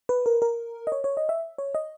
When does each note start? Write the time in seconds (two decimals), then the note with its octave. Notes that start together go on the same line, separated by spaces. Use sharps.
0.09 B4
0.26 A#4
0.42 A#4
0.87 D#5
0.92 C#5
1.04 C#5
1.17 D#5
1.29 E5
1.58 C#5
1.75 D#5